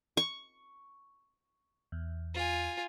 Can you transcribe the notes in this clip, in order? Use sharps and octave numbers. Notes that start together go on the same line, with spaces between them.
C#6
E2
F4 G#5